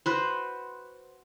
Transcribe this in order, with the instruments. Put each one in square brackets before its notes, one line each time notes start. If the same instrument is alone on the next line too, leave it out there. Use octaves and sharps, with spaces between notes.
[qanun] F#4 B4 C5